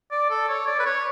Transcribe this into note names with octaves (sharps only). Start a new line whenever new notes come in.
D5
A4
C#5
D5
B4
C#5